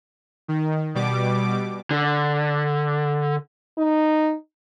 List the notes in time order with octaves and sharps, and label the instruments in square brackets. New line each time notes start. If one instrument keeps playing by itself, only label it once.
[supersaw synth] D#3
B2 G3 D6
[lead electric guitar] D3
[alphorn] D#4